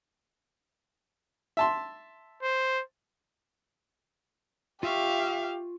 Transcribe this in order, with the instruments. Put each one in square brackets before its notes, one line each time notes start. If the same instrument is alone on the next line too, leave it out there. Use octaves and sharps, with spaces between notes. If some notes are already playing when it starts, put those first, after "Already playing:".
[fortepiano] E5 A5 C6
[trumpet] C5
[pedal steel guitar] F4 C#6 [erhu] G4 [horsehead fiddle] E5 F5